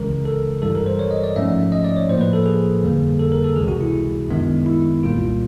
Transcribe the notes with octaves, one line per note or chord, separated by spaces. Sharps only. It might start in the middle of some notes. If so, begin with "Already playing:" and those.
Already playing: C#2 C#3 E3 G#3 A#4
A4
G2 E3 G3 A4
A#4
C5
C#5
D#5
D5
G#2 F3 A3 C#4 E5
D#5
D5
C#5
A2 F3 A#3 C5
B4
A4
G#4
F2 D3 G3 A#3
A4
A#4
A4
C#2 C3 E3 G#3 G#4
F#4
E4
F#2 D#3 G#3 B3 D4
E4
C2 A#2 G3 A#3 F4